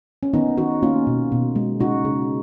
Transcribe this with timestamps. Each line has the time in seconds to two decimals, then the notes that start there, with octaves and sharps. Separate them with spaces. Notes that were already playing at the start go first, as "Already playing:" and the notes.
0.23 C#4
0.34 D#3 B3 D#4
0.58 D#3 D#4 F#4
0.82 A#3 C#4 F4
1.07 B2
1.32 B2
1.56 G#3
1.80 C#3 D#4 F#4
2.05 C#3